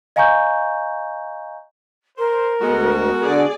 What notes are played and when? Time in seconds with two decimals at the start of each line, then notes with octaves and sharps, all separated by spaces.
0.16 D#5 F5 G#5 A#5 C#6 G6
2.18 A#4 C5
2.61 D2 G#3 B3 F#4 A4
3.22 D3 G#4 D5